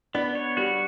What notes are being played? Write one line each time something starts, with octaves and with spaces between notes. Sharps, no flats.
B3 D4
C#5
G3 F#4